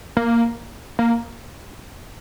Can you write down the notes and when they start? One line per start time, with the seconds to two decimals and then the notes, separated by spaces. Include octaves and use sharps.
0.17 A#3
0.99 A#3